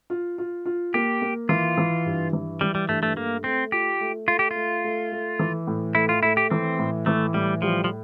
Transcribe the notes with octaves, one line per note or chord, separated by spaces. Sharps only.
F4
F4
F4
A#3 G4
A#3
E3 F4
E3
G2
E3
E3 G3
G3
G2 A3
A3
A3 A#3
A3 C4
F4 G4
A3
A3 F4
G4
A3 F4
A3
A3
E3
A2
A3 E4
F4
A3 E4
G4
E3 C4
A2
E3 A3
A2 G3
F3 G3
F3